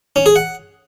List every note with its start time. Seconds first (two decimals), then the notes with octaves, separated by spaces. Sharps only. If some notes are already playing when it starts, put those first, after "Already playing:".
0.16 C#4
0.26 G#4
0.36 F#5